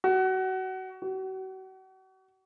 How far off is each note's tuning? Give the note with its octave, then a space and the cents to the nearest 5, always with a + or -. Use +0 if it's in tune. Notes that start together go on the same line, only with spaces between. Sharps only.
F#4 +25
F#4 +40